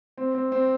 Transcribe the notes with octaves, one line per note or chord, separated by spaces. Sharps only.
C4
C4
C4